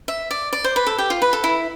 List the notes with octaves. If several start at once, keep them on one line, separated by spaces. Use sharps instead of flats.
E5
D5
D5
C5
B4
A4
G4
F4
B4
A4
E4